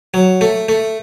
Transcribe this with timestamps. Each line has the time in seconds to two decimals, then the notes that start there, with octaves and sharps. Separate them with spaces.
0.14 F#3
0.41 A3
0.69 A3